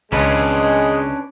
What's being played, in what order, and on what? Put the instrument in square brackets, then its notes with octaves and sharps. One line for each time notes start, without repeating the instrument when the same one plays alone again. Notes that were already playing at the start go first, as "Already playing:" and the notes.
[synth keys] C#2 [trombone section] G#3 [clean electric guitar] C#4 D4 B4